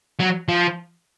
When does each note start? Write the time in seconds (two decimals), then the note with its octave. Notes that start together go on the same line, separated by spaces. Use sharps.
0.20 F#3
0.49 F3